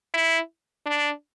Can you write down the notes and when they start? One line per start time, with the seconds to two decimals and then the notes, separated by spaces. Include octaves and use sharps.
0.14 E4
0.86 D4